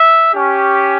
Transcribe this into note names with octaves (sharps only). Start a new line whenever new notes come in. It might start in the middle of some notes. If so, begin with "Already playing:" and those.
Already playing: E5
C#4 G4